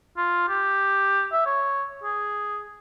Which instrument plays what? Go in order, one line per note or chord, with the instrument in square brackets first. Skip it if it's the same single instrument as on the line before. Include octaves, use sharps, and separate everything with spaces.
[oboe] F4
G4
E5
C#5
G#4